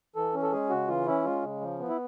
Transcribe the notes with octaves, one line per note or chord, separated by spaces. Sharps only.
E3 A4
C#4
A4
G#3 G#4
C#3 F#4
E3 F4
C#4 E4
G#3 F4
C#3
F3
B3
E4